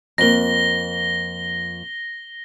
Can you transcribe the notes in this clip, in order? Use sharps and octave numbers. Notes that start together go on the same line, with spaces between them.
F2 A#3 A#6 G7